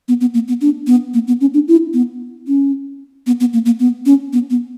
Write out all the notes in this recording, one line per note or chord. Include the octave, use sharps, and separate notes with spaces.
B3
B3
A#3
B3
D4
B3
A#3
B3
C#4
D4
E4
B3
C#4
B3
B3
A#3
A#3
B3
C#4
B3
B3